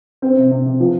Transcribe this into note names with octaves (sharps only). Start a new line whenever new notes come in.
C4
C3
C3
C3
F3